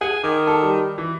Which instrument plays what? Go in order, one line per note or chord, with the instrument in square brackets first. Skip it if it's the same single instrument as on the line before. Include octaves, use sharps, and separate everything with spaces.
[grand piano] G#4 F#5 [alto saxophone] G#5
[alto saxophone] D#3 [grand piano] D6
[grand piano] A4
G3
E3